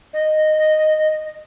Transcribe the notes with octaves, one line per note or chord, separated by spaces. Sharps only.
D#5